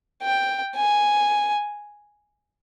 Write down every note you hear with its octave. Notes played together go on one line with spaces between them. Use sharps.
G5
G#5